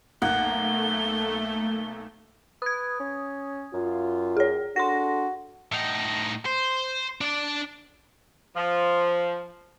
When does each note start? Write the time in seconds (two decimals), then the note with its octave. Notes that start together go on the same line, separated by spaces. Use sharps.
0.22 B1 A3 A#3 F#5 G7
2.62 B4 D#6 G#6
3.00 C#4
3.74 F#2 F4
4.37 G#4 C#5
4.76 D4 F#4 A4 C6 A#6
5.72 A2 D#4
6.46 C5
7.21 D4 D5
8.55 F3